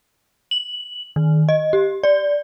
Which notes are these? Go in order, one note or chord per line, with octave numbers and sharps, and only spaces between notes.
F#7
D#3
D#5
G4
D5